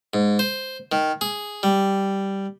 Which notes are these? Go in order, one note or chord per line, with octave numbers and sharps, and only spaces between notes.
G#2
C5
D#3
G#4
G3